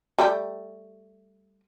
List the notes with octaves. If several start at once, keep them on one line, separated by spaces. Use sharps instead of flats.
G3 A3 G4